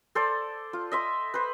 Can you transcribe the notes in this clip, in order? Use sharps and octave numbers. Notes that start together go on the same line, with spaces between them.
A4 C5 D5
F4
D#5 E5 C6
B4 C5